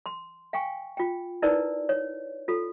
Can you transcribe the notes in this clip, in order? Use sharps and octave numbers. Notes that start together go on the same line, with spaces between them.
C6
F5 G5 G#5 C#6
F4 G5
D#4 E4 A#4 B4 D5
C#5
F4 A4